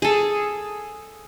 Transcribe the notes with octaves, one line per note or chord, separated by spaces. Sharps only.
G#4 A4